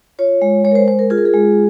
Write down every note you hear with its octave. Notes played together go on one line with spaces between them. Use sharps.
F4 C#5
G#3
G#3 C#5
A#4
C5
G#3 C5
A#4
F4 G#4
A#4
G#4
G#3